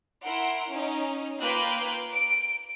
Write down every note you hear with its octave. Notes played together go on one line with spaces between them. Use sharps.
E4 A#4 F#5 C6 D7
C#4 D#4
A#3 F4 B4 G5 F#6 G6
D7